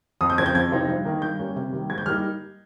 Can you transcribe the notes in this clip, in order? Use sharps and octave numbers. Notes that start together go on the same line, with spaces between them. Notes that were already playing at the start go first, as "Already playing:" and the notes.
F2 D#6
G6
C#3 F3 C4 G#6
G6
F2 G#6
C3 F3 C4 D#4
G2
D#3 A#3 D#4
G2 G6
G3 A#3 C#4
C3
D#3 G3 A#3
G#2 G#6
G6
G3 A#3 D#4 F6